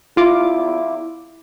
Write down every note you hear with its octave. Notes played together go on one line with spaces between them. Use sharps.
E4 F4 D6